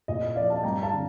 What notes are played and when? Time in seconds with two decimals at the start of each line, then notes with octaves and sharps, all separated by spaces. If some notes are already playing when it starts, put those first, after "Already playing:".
0.08 A#2 D#5
0.23 D#5
0.36 F3 D5 F5
0.50 F5 A5
0.63 G2 G5 A#5
0.83 F5 A5
0.92 D3